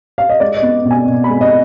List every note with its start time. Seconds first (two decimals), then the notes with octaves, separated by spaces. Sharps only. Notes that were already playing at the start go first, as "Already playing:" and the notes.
0.18 F5
0.29 D#5
0.40 G#3 D5
0.57 D#5
0.63 B3
0.85 B2
0.91 G#5
1.07 B2
1.24 B5
1.30 G#3
1.41 D#5